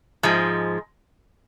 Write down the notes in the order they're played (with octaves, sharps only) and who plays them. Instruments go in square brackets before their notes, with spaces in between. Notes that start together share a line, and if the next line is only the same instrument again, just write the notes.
[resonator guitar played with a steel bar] G#2 F3 G#3